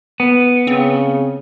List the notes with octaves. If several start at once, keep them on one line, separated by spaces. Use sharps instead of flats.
B3
C#3 C4